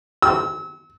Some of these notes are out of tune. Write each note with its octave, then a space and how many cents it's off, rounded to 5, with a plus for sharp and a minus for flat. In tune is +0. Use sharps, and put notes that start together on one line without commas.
E6 -35